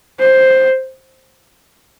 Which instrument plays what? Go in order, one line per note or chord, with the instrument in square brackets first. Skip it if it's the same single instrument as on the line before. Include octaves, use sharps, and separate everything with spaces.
[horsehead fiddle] C5